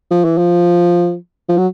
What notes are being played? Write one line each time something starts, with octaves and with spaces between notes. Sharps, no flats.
F3
E3
F3
F3
F#3